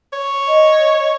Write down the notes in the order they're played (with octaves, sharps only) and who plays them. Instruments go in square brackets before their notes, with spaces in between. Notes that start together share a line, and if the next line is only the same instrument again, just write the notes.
[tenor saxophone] C#5
[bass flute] D#5